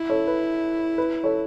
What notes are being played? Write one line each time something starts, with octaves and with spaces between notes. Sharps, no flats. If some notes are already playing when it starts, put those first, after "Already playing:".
Already playing: E4
A4 C#5
B4
B4
A4 C#5